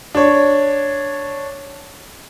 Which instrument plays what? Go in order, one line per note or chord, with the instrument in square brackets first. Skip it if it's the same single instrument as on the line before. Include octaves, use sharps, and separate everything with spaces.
[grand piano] D4 C#5